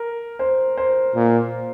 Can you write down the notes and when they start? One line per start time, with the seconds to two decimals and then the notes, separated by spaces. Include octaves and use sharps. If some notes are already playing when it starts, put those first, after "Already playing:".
Already playing: A#4
0.39 C5
0.77 C5
1.15 A#2